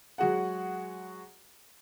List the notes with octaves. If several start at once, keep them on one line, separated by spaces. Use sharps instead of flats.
F#3 G#3 F#4 G#4 F#5